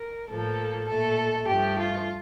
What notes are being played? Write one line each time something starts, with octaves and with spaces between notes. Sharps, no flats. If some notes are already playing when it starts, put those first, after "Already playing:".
Already playing: A#4
A2 F3 A#3 A4
A#2 A3 A4
G2 F3 A3 G4
F4